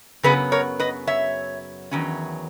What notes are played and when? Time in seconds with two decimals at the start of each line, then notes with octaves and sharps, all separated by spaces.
0.23 F#2 C#3 F#3 B3 G#4 B4
0.52 A#4 C#5
0.80 B4 D#5
1.07 C#5 E5
1.91 E2 D#3 F#3 C#4